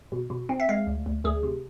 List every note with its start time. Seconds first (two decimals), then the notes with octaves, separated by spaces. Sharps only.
0.12 B2
0.30 B2
0.49 C4
0.60 E5
0.69 G#3 F5
0.87 D2
1.06 D2
1.24 D2 G#4
1.43 C3